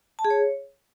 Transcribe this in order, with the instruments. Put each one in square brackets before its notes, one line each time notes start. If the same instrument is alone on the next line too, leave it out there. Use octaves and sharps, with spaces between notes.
[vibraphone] A5
G#4
C#5